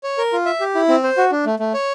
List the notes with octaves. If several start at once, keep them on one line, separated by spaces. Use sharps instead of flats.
C#5
A#4
F4
E5
G4
E4
C4
C5
F#4
D4
A3
A3
C#5